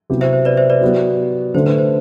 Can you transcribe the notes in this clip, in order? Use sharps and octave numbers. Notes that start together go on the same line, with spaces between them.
C3 F#3 B3 E4 G4
C5 E5
C5
B4 D5
C5 E5
B4 D5
F#3 B3 E4 G4
D3 A3 D4 C5
B4
C5